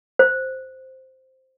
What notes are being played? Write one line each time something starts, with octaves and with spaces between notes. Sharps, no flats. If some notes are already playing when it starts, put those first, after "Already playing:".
C5